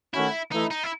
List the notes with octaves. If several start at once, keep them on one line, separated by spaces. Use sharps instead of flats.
D#3 A3 C#4 E4 F#4
E3 A3 D#4 E4
D#4
E4